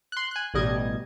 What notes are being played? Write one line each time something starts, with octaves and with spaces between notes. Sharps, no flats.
C6 F#6
G#5 F#6
A1 B2 G3 D#5 G#6